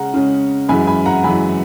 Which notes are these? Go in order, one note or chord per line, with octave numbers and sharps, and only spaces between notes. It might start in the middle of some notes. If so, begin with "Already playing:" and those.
Already playing: C#3 G#3 C#4 F#5 A#5
C#3 G#3 C#4
F#2 E3 G#3 G#5 B5
G#5 B5
F#5 A#5
F#2 E3 G#3 G#5 B5